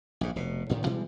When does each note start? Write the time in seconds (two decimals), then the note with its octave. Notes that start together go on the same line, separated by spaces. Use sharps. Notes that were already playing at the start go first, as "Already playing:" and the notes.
0.21 A#1 G#2
0.36 F1 B2
0.69 A1 A2 D#3
0.86 B2 E3 G3 G#3